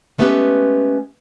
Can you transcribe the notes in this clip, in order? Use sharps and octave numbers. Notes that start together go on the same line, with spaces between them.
G#3 A3 B3 C#4 G4 B4